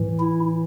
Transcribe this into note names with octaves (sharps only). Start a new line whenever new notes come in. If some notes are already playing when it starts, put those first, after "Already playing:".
Already playing: A2 E3
E4